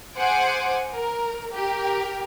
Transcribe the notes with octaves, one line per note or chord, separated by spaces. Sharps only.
G#4 C5 F#5 G#5 D6
A#4
G4 A#4